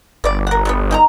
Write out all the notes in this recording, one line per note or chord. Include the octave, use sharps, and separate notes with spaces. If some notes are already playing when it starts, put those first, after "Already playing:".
G1 B4 D5
A#4 F#5
F#3 G3 B3
D#4 G5 A#5